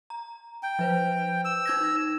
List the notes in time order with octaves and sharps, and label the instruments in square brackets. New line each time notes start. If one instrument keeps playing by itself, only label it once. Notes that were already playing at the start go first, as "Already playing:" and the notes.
[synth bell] A#5
[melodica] G5
[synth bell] F3 B4 C5
[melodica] E6
[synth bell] D#4 G#6 A#6